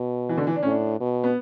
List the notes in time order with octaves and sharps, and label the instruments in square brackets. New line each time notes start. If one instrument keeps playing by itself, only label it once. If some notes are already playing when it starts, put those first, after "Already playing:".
Already playing: [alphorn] B2
[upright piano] E3
D3
E3
D4
[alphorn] A2 [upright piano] C#4
[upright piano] D4
[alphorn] B2
[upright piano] B3